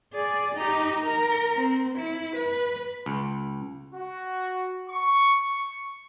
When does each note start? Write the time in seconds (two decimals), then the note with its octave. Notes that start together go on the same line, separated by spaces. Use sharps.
0.13 G#4 D5
0.55 D#4 G4
1.04 A#4
1.56 C4
1.98 E4
2.35 B4
3.06 C#2
3.94 F#4
4.90 C#6